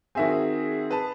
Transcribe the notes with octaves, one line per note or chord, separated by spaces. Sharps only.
D#3 C4 F#4 G#4 E5 G#5
B4 A5